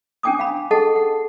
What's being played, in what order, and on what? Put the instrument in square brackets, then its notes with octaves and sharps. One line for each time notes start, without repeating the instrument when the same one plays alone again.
[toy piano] C#4 D4 G5 G#5 D6 D#6
F5 B5
G#4 A4 D#5 F#5 A5
F#5